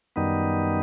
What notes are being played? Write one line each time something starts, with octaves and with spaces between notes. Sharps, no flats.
F#2 D#3 G3 B3 D#4